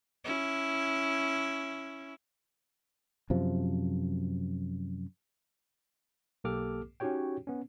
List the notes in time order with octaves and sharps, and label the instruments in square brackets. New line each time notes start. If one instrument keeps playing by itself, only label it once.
[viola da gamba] C#4 E4
[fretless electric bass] F#2 C3 F3
[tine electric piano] B1 A#3 G4 A4 D6 F6
C#4 D#4 F#4 G4 C#5 G5
B3 C#4